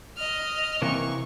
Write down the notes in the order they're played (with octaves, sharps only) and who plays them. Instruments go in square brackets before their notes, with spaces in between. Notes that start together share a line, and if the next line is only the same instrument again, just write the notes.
[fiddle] D#5 F6
[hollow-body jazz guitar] C3 E3 A#3 [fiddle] C#6